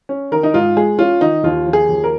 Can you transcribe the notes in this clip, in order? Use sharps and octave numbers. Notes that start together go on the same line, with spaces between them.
C#4
D#3 A#4
D#4
G#2 F4
G#3 G#4
C#4 F4
D#3 D#4
D#2 F4
F3
G#4
D#2
A#4